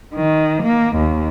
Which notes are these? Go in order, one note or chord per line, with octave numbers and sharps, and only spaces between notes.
D#3
A#3
D#2